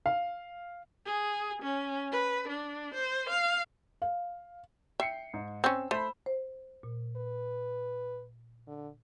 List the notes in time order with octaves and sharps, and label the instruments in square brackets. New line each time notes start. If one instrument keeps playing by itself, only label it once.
[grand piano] F5
[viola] G#4
C#4
B4
D4
C5
F5
[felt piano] F5
[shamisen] E5 [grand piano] G5 C7 C#7
[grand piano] G#2
[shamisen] C4 C#4 [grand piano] E6
[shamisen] A3 [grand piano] C5 B5
[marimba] C5
A#2
[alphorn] B4
D3